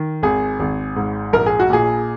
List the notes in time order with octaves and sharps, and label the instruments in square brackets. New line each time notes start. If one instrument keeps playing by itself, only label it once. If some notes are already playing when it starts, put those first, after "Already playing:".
Already playing: [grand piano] D#3
G#1 G#4
G#1
G#2
A#1 A#4
G#4
F#4
A#2 G#4